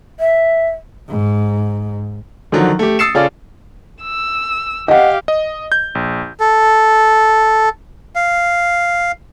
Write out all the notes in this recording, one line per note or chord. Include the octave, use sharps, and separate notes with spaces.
E5
G#2
D3 D#3 F3 F#3
A3 G4
D#6 E6 A6 C7 C#7 E7
C#3 C#4 F4 A4 D5
E6
G4 D#5 F5 F#5
D#5
G6
A#1
A4
F5